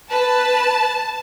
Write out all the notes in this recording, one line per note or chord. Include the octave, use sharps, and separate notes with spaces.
B4 A5